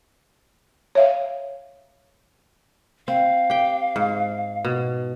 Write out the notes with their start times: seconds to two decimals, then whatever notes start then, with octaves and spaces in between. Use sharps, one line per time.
0.95 C#5 E5 F5
3.08 C4 F5
3.50 G4 G5
3.96 G#2
4.65 B2